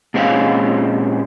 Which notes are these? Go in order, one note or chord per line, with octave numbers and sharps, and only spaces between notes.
A#2 G#3 C4 C#4 F5